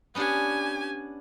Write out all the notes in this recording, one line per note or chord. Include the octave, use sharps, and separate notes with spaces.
B3 C#4 D4 G4 G#5